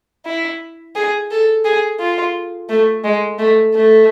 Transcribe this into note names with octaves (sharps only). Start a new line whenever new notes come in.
E4
G#4
A4
G#4
F4
A3
G#3
A3
A3